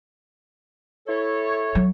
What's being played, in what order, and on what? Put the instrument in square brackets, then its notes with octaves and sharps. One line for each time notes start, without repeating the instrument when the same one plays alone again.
[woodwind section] E4 A4 C#5
[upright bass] F#3